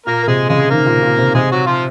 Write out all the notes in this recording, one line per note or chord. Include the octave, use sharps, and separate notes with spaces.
A#2 A#3 A#4
A#4
C3 G#3 G#4
C#3 G#3 G#4
D#3 A#3 A#4
A#2
A#2
C3
C3 G#3 G#4
F#3 F#4
F3 F4